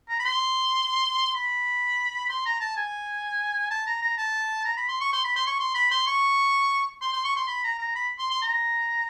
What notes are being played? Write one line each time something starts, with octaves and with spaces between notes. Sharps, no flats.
A#5
B5
C6
B5
C6
A#5
A5
G#5
A5
A#5
A#5
A5
A#5
B5
C6
C#6
C6
B5
C6
C#6
C6
B5
C6
C#6
C6
C6
C#6
C6
B5
A#5
A#5
B5
C6
C6
A#5